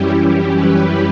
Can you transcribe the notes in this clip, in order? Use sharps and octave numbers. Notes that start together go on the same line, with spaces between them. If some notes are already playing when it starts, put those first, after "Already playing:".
Already playing: F#2 E3 G3 C#4 E4 G4
G4
B4